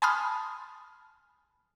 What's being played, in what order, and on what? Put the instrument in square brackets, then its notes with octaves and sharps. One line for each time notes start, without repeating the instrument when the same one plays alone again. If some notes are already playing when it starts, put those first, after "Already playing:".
[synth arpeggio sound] G#5 A5 B5 C6 D#6 F6